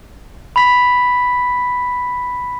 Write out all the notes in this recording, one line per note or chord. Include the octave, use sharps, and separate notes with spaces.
B5 B6